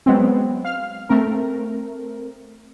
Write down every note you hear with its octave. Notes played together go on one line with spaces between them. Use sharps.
F#3 G#3 B3 C4
F5 F6
A3 C4 A#4